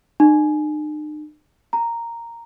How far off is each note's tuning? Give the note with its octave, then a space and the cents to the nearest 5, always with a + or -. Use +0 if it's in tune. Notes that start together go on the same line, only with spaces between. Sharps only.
D#4 -45
A#5 -5